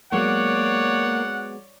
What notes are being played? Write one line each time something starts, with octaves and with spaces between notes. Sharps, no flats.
F#3 G#3 A#3 B3 C#5 D5 F#5